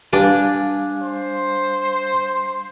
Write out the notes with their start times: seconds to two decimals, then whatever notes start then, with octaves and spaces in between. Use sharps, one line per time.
0.13 G3 D4 G4 B4 F5 G#5 B5
1.02 C5